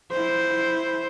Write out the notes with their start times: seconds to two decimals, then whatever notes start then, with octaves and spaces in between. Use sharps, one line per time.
0.12 E4 C5